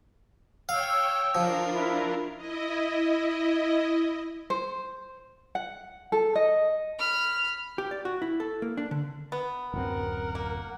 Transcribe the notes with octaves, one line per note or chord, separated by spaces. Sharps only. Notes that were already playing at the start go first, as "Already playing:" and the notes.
C#5 F5 G5 E6
F3 D4 F4 A#4
E4
E4 D#5
C5
F#5
A4
D#5
B5 F6
G4
D5
F#4
E4
A4
A#3
D4
D3
B3
D1 F#2 C4 A#4 F#5
A#3